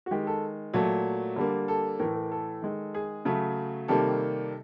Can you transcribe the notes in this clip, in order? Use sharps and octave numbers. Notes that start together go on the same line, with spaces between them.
F#4
D#3 G#3 G4
A4
A#2 F#3 A3
D3 G3 A#3
A4
A2 E3 A3 A#4
A#4
A4
D#3 G#3
G#4
C#3 F#3 A3
C3 D#3 G3 A#3 A4